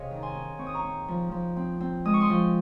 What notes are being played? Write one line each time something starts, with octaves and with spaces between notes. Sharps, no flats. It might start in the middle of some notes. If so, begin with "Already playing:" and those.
Already playing: C3 C#4 G#4 C#5 D#5 F5
D#3
A#5
G#5 C6
C#4
C4 C#6
D#6
A#5 C#6
C4
F3
F3
C4
C4
G#3 D#6
C#6
C6 D#6
F3